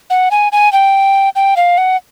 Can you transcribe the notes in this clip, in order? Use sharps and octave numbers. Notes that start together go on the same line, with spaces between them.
F#5
G#5
G#5
G5
G5
F5
F#5